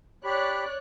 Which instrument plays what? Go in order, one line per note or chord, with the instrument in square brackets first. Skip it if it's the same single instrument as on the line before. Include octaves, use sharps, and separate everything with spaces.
[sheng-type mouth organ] G4 B5 [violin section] C#5 D5 F#6